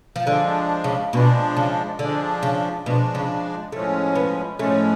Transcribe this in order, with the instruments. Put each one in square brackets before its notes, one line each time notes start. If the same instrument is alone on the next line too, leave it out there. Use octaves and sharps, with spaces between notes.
[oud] F3
[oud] D3 [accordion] F3 G#3 D4
[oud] C#3
[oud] B2 [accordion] F3 G#3 D4
[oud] C#3
[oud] D3 [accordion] F3 G#3 D4
[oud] C#3
[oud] B2 [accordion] F3 G#3 D4
[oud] C#3
[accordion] A2 F3 G#3 C#4 [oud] A3
[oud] B3
[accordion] A2 F3 G#3 C#4 [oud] A3